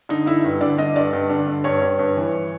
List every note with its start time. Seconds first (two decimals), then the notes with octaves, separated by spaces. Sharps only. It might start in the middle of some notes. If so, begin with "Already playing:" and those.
0.09 D3 D#4
0.26 D3 E4
0.44 G2
0.61 D3 D5
0.78 D3 D#5
0.96 G2 D5
1.13 G2
1.30 D3
1.48 D3
1.64 G2 C#5
1.82 G2
1.99 G2
2.17 E3
2.34 E3